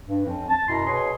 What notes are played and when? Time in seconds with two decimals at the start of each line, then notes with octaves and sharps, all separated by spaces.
0.06 G2
0.25 F2 F3 C4 C#4
0.49 A5
0.68 F#2 B2 C#4 E4 A#5 C6
0.86 B2 G#4 B4 C#5 C6